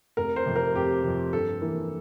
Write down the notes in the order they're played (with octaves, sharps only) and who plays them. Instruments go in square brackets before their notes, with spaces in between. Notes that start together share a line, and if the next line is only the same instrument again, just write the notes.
[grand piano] F1 A#4
C5
F2 C3
A#4
F1 G4
F2 C3
G2 A4
E3 A#3